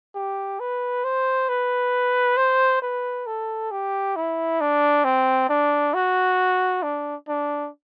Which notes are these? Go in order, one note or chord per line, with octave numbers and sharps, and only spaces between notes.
G4
B4
C5
B4
C5
B4
A4
G4
E4
D4
C4
D4
F#4
D4
D4